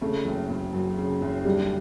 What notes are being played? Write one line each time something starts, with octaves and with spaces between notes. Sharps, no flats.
C#3 A3
F#1
F#1
F#2
C#3
F#1
D3 G3